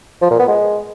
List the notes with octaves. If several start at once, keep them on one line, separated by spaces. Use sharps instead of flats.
F3
A#2
B3
G#3